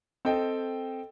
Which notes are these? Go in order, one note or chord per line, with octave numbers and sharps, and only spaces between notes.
C4 A4 D#5 G5